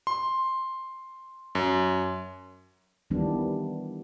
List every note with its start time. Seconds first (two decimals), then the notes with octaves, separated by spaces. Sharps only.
0.07 C6
1.55 F#2
3.10 D#3 E3 G3 B3 D4